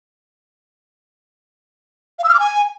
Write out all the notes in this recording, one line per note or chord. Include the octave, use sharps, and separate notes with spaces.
F5
E6
F6
D6
G#5